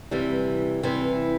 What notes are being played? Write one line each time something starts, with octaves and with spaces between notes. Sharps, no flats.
C3 E3 G3
C3 E3 G3